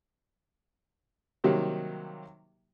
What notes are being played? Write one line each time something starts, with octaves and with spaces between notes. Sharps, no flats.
C3 D#3 F#3 G3 A#3